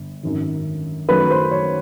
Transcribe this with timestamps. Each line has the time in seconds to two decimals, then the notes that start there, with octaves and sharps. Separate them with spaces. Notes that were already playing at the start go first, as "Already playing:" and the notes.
Already playing: G1
0.23 G#1 F#2 D#3
1.09 F#2 D#3 F#3 A3 B4
1.30 C5
1.51 C#5